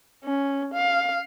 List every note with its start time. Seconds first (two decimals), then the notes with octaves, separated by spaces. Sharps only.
0.24 C#4
0.74 F5